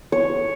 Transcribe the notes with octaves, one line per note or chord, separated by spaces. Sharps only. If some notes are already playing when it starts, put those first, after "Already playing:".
C#5